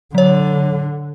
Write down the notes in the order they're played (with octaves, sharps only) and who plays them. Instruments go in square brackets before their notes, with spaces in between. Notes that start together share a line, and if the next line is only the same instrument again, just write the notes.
[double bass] D3 [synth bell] F#3 C#5